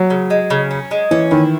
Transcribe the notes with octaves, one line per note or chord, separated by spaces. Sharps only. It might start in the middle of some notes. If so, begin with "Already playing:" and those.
Already playing: F#3
C#3
G#3
C#3
C#4
G#3
E3 C#4
D#3 E4